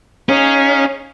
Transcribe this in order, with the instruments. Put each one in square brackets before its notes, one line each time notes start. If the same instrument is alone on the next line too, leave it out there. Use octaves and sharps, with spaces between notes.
[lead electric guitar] C#4 [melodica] D#4 G#4 F5 [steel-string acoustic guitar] C#5